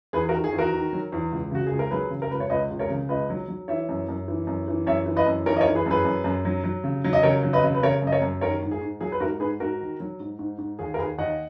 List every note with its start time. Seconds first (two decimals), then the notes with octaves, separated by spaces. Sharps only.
0.13 E2 G#4 B4
0.29 F#4 A#4
0.33 D#3
0.44 G#4
0.53 E2
0.58 F#4 A#4
0.73 D#3
0.93 F#3
1.12 E2
1.32 C#2
1.51 C#3 F#4
1.67 C#2 G#4
1.79 A#4
1.91 F#3 G#4 B4
2.10 C#3
2.22 A#4
2.31 C#2 B4
2.40 C#5
2.50 C#2 B4 D#5
2.71 C#2
2.79 A#4 C#5
2.90 C#3
3.09 C#2 B4 D#5
3.30 F#3
3.48 F#3
3.68 E3 C#5 E5
3.89 F#2
4.09 F#2
4.28 E3
4.47 F#2
4.68 E3
4.87 F#2 C#5 E5
5.06 E3
5.16 B4 D#5
5.26 F#2
5.46 E3 A#4 C#5
5.57 D#5
5.61 A#4 C#5
5.66 E3
5.75 G#4 B4
5.86 F#2 G#4 B4
6.05 F#2
6.24 F#2
6.45 F#3
6.64 F#3
6.84 C#3
7.04 F#3
7.13 D#5
7.23 C#3 A#4 C#5
7.43 F#3
7.53 B4 D#5
7.64 C#3
7.74 B4
7.83 C#3 A#4 C#5
8.02 F#2
8.07 D#5
8.12 A#4 C#5
8.22 F#2
8.41 D#3 A#4 C#5
8.62 G#2
8.71 G#4
8.81 G#2
9.01 F#3 G#4
9.12 B4
9.20 G#2 F#4 A#4
9.40 G#2 G#4 B4
9.60 G#2 F#4 A#4
9.81 D#3
10.00 F#3
10.20 G#2
10.39 G#2
10.58 G#2
10.79 D#2 G#4
10.94 A#4
10.98 D#2 G#4 B4
11.18 D#2 D#5 F#5